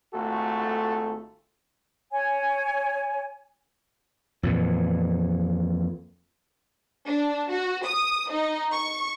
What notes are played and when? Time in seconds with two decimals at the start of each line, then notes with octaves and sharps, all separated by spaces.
0.13 G#1 A3 F4 F#4 A4
2.12 C#5 G#5
4.43 F2 A#2 E3
7.08 D4
7.51 F#4
7.86 D#6
8.31 D#4
8.72 C#6